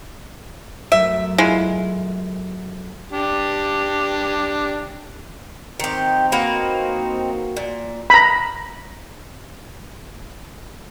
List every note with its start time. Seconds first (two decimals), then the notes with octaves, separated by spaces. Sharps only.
0.92 F#2 F#3 A3 E5
1.38 G#3 E4 F4
3.12 D4 G4
5.80 D#3 C4 D#4 G4
6.32 A#3 F#4 B4
7.57 A#2
8.10 A#5 B5